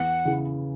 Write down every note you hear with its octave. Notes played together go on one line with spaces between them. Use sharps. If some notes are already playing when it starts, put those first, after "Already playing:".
Already playing: E2 F#5
C#3 E3